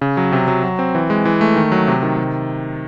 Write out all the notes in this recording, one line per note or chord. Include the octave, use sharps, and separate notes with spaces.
C#3
F#3
C3
F#3
F#3
C4
E3
G#3
E3
A3
D#3
F#3
C3
D#3
C3